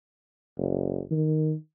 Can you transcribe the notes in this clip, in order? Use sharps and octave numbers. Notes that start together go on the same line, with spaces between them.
F#1
D#3